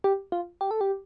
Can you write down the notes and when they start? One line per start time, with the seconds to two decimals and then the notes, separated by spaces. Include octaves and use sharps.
0.04 G4
0.32 F4
0.61 G4
0.71 A4
0.81 G4